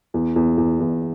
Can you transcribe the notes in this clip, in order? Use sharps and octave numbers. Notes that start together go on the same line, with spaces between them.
E2
E2
E2
E2